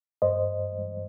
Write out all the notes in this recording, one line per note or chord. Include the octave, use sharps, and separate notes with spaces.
G2 C5 D#5